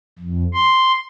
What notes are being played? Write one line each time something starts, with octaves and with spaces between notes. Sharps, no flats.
F2
C6